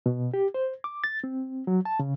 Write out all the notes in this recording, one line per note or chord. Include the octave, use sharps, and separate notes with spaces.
B2
G4
C5
D6
A6
C4
F#3
A5
C#3